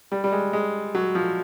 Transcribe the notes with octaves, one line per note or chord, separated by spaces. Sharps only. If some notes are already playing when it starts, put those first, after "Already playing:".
G3
G3
G#3
G#3
F#3
F3